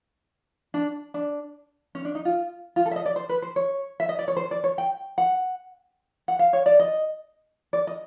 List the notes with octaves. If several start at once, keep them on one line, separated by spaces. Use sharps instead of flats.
D4
D4
C#4
D4
D#4
F4
F4
A4
E5
D#5
D5
C5
B4
C5
C#5
E5
D#5
D5
C#5
C5
D5
C#5
G5
F#5
F#5
F5
C#5
D5
D#5
D5
D#5